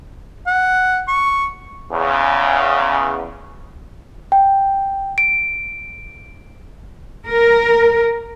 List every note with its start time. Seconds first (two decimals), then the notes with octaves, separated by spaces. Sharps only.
0.47 F#5
1.08 C#6
1.92 E2 C#3
4.32 G5
5.18 D7
7.28 A#4